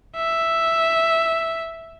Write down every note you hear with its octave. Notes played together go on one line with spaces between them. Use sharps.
E5